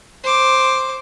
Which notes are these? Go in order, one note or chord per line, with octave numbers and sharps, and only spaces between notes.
C5 D6